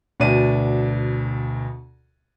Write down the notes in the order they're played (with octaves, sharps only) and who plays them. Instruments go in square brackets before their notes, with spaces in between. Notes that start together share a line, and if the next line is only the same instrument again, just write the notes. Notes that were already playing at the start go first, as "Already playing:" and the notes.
[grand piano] D2 B2 D4 D5 D#7